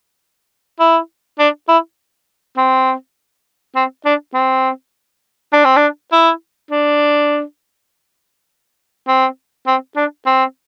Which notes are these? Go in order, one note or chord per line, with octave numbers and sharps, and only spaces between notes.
E4
D4
E4
C4
C4
D4
C4
D4
C4
D4
E4
D4
C4
C4
D4
C4